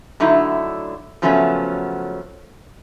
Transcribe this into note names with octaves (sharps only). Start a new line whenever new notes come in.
D3 F#3 A3 D#4 E4
C#3 F3 F#3 A3 B3 C#4